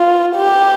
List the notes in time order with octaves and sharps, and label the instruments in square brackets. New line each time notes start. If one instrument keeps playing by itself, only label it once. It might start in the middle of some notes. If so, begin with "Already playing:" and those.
Already playing: [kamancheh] F4
G4